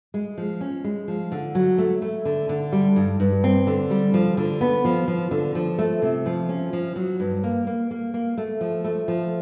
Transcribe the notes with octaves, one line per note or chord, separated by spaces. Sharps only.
G#3
F3
C#4
G#3
F3
D3
F#3
A3
A3
D3
D3
G3
G2
G2
C4
D3
G3
F3
D3
B3
F3
F3
D3
F3
A3
C3
F3
C#4
F3
F#3
G2
A#3
A#3
A#3
A#3
A3
F3
A3
F3